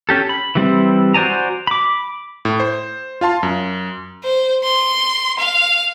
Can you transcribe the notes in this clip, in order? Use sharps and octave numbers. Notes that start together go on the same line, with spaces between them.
C#4 G4 A4
B5
E3 G3 C4 E4
F#4 C5 D5 G#5 A#5
B5 D6
A2
C5
F4 F5 A5 C6
F#2
C5
C6
F5